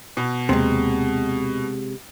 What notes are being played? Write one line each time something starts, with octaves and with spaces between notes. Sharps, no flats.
B2
D#2 C3 G#3 A#3